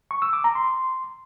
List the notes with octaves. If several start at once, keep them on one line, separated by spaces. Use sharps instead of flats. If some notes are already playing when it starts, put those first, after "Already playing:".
C#6
E6
D6
A#5
C6